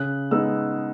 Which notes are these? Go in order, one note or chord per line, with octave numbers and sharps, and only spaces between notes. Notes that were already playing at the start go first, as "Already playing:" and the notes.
Already playing: C#3 F#6
G#3 B3 D#4 E6